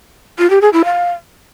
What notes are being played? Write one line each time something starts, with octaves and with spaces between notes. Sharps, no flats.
F4
G4
G#4
E4
F5